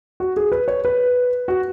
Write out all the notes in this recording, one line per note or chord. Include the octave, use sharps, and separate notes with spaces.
F#4
G#4
B4
C#5
B4
F#4